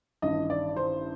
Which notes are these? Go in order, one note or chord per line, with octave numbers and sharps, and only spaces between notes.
A1 G2 D#3 D#5
D5
C5